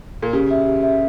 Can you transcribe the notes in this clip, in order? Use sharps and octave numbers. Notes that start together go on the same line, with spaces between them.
A#2
C#3 G4
E5
G4
E5